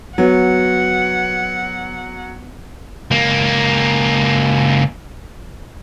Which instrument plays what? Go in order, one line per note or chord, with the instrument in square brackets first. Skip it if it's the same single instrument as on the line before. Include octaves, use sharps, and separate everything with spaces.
[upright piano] F#3 [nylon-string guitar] B3 [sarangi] F#5
[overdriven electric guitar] C#2 A#3